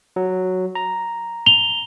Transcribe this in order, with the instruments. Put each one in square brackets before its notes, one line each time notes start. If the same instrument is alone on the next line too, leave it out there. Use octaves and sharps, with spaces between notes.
[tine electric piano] F#3
A#5
[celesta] F7 G7